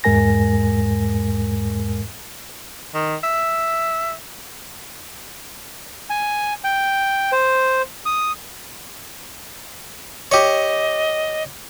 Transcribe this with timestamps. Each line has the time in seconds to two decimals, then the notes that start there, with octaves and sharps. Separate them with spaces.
0.04 E2 G#2 G#3 A#4 G#5 A#6
2.94 D#3
3.24 E5
6.10 G#5
6.64 G5
7.32 C5
8.06 D#6
10.31 G4 C#5 D#5